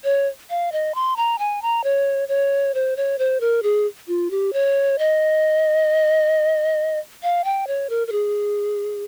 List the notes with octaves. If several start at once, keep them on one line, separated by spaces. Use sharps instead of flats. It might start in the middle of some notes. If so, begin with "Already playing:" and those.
C#5
F5
D#5
C6
A#5
G#5
A#5
C#5
C#5
C5
C#5
C5
A#4
G#4
F4
G4
C#5
D#5
F5
G5
C#5
A#4
A#4
G#4